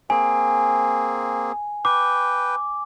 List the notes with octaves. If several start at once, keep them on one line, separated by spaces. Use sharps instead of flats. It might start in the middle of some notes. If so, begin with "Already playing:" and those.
A#3 C4 G#4 G#5
B4 G5 D6